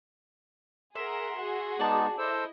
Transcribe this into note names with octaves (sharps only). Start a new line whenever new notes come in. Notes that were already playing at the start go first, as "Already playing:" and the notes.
G#4 A#4 E5 F#5 C6
F#4 G#4
G#3 B3 D#4 D5 A5
E4 A4 C5 D#5 E6